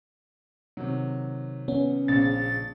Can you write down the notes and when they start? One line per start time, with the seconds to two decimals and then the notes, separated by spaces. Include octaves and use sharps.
0.77 C3 D#3 F#3
1.68 B3 C#4
2.08 A#1 C#3 A6